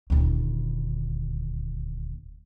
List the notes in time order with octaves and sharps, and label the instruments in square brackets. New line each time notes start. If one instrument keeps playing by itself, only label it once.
[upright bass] D#1 D2